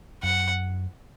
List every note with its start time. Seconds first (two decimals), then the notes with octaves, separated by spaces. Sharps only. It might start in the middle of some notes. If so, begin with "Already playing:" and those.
0.23 F#2 F#5